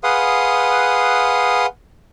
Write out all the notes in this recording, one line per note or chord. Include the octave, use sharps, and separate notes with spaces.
G#4 B4 F5 F#5 C6 D#6